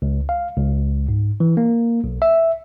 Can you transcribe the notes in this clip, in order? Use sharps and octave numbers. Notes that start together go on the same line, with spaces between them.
C#2
F5
C#2
G#2
E3
A#3
B1
E5